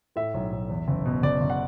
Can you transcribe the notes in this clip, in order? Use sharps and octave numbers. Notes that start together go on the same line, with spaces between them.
A2 E5
B1
B1
E2
F#1
B2
F#1 D5
F#1
F#5